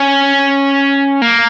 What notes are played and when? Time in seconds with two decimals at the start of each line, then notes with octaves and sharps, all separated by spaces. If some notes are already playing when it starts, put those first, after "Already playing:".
Already playing: C#4
1.22 A#3